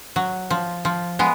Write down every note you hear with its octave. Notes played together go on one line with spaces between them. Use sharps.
F#3
F3
F3
G#3 B3